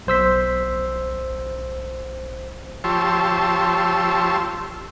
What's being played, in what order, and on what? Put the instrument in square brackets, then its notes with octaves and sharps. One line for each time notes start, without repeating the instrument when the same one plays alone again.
[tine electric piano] B1 C5 E6 B6
[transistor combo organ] F3 G4 C#5 A5 C6 E6